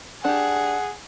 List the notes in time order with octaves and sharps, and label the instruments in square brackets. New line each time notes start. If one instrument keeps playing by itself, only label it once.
[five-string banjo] D4 G4 [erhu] G#4 [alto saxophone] F#5